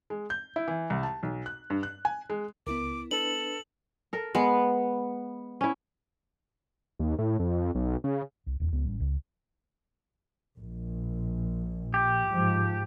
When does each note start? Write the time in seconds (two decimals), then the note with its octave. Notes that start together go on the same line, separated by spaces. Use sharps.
0.10 G#3
0.30 G6
0.56 E4
0.68 E3
0.90 C2
1.03 A5
1.23 B1
1.46 F#6
1.70 G2
1.83 F#6
2.05 G#5
2.30 G#3
2.67 C#2 B3 E4 A#4 D6
3.11 D4 A4 B4 F#7
4.13 A4 A#4
4.35 G#3 B3
5.61 C#4 E4
6.99 D#2
7.18 A2
7.39 F2
7.75 B1
8.04 C#3
8.46 C2
8.60 D#1 E2
8.72 C#2 B3
8.85 A1 G3 C#4
9.00 C#2 C#3
10.58 A#1
11.94 G4
12.28 G#2 F3